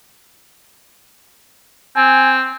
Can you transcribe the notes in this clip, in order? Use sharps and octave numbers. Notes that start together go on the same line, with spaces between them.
C4 G#5